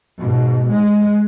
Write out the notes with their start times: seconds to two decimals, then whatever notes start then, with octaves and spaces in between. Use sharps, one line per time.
0.18 G#2 B2
0.74 G#3